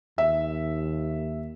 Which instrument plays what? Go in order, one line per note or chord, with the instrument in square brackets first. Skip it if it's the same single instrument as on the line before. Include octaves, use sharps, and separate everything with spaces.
[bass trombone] D#2 [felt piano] E5